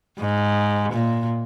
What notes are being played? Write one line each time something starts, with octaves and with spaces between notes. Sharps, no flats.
G#2
A#2